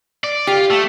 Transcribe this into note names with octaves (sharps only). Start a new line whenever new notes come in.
D5
F4 G4
A3